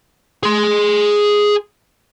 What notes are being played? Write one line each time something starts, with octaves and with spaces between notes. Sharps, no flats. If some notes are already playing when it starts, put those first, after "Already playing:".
G#4 C6